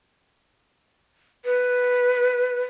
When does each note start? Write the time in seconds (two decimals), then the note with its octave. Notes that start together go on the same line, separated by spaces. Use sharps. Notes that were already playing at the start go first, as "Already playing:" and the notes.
1.45 B4